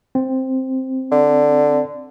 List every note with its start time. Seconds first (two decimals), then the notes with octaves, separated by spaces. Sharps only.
0.15 C4
1.12 D3